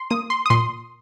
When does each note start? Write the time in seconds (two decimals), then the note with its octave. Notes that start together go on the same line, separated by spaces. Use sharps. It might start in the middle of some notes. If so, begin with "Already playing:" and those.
Already playing: C6
0.10 A#3 D#6
0.30 C6
0.46 D#6
0.50 A#2 C6